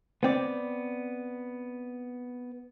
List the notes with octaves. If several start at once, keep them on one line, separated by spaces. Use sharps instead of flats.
B3 C4 D5